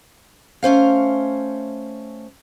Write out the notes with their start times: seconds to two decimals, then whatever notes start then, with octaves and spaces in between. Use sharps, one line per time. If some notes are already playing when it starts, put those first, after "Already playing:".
0.63 A3 C#4 C5 F5